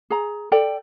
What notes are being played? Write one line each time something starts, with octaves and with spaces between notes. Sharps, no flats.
G#4 A#5
A4 D5 G5